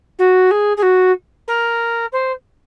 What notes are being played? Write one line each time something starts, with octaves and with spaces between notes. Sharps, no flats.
F#4
G#4
G#4
F#4
A#4
C5